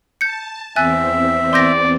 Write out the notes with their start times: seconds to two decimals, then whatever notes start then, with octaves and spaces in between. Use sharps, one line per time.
0.21 A5 G6 C#7
0.76 E2 C4 E5 G#5 F#6 A6
1.53 D5 C6 G6 A#6